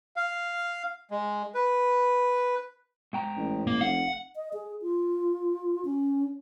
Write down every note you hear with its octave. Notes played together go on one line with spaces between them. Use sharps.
F5
G#3
B4
G#2 G5 A#5
A1
A#3
F1 F5 F#5
D#5
G#4
F4
C#4